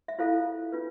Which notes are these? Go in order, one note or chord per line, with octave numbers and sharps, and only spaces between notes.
E5
E4 F4 A4 C5 F5
D4 F4 B4